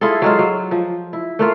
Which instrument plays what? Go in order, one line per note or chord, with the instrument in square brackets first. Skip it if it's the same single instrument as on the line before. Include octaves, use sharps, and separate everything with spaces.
[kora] E4 F4 G#4 A4
F#3 G#3 F4
F#3
F3
E4
A3 A#3 F4